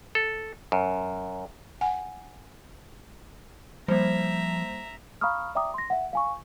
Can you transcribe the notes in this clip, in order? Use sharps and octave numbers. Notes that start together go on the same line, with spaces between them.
A4
F#2
F#5 G#5
F3 G3 A#3 C5 E5 A#5
F5 A#5 B5 C#6 D#6 F6
D5 E5 G5 A#5 D6 D#6
C6 A#6
E5 F#5
F5 G#5 C#6